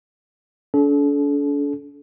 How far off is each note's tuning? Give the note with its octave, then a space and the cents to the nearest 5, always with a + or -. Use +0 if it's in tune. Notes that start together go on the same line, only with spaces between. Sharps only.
D4 -45 A4 -35